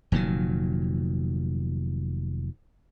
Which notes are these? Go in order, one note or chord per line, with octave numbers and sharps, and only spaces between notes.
F1 A#2 D#3 F#3